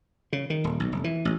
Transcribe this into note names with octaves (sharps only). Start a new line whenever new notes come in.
C#3
D#3
D#1
B1
F1
E3
A1